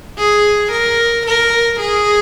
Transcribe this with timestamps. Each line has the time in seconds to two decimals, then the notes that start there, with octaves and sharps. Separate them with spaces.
0.18 G#4
0.72 A#4
1.26 A#4
1.80 G#4